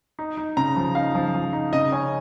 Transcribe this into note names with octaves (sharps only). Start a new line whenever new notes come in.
D#4
D#4
C#3 A#5
F3
D#4 F5
F3
F3
D#4
C#3 D#5
C#4 G#5